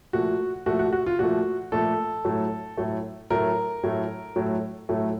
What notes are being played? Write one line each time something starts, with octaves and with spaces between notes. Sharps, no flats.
A#2 F3 A3 F#4
A#2 F3 A3 F#4
F#4
F#4
F4
A#2 F3 A3 F#4
A#2 F3 A3 A4
A2 F#3 A3
A2 F#3 A3
A2 F#3 A3 A#4
A2 F#3 A3
A2 F#3 A3
A2 F#3 A3